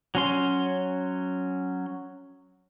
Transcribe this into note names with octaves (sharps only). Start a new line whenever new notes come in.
F#3 C#4 C6